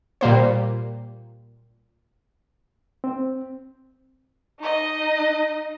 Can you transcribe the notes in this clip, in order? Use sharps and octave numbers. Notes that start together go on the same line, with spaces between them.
A#2 G3 A#3 C5
C4
D#4 D#5